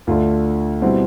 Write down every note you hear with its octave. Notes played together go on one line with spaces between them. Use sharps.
D2 D3 A3 D4 F4
B2 G3 C4 E4